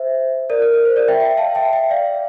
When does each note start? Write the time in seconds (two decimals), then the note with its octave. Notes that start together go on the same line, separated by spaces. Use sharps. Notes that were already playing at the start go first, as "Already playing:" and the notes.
Already playing: C5 E5
0.50 A#4 D5
0.62 A#4
0.74 A#4
0.85 C5
0.96 A#4 D5
1.08 E5 G5
1.20 E5 G5
1.37 F5 A5
1.55 E5 G5
1.73 E5 G5
1.90 D5 F5